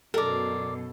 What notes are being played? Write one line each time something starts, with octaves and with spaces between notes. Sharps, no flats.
F#2 B2 A4 A#4 D5